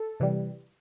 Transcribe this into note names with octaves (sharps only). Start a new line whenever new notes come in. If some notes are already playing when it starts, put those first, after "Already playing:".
Already playing: A4
C3 E3 G3